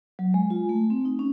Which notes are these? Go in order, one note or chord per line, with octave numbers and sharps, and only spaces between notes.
F#3
G#3
F4
A3
C4
D#4
C#4